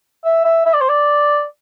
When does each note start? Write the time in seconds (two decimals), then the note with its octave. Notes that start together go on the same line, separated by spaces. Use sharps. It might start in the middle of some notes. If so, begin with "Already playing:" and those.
0.25 E5
0.45 E5
0.66 E5
0.74 D5
0.81 C5
0.90 D5